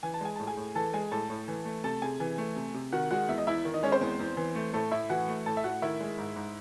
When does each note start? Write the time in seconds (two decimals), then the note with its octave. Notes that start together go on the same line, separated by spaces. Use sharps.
0.03 E3 G#5
0.14 A5
0.21 G#3 G#5
0.36 A2 A5
0.47 G#4 G#5
0.57 A2
0.75 E3 A4 A5
0.93 G#3 G#4 G#5
1.11 A2 A4 A5
1.30 A2
1.48 E3
1.65 A3
1.84 C3 A4 A5
2.02 C3 G#4 G#5
2.20 E3
2.38 A3
2.56 C3
2.74 C3
2.92 D#3 F#4 F#5
3.11 G#3 F#4 F#5
3.29 E2 E5
3.38 D#5
3.47 E2 E4 E5
3.65 D#3
3.74 D#4 D#5
3.83 G#3 C#4 C#5
3.92 C4 C5
4.01 E2
4.19 E2
4.37 E3
4.55 A3
4.73 A2 A3 A4
4.91 A2 E4 E5
5.10 E3 F#4 F#5
5.28 A3
5.46 A2 A4 A5
5.57 E5
5.64 A2 F#4 F#5
5.82 D#3 E4 E5
6.01 G#3
6.18 G#2
6.36 G#2